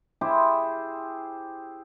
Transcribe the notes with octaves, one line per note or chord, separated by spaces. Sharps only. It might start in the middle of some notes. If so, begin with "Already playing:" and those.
E4 G4 G#4 C5